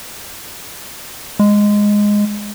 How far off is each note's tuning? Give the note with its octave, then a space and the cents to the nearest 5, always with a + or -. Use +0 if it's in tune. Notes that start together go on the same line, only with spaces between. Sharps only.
G#3 -5